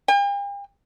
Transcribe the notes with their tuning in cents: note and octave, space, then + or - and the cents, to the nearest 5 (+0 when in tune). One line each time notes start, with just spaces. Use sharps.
G5 +45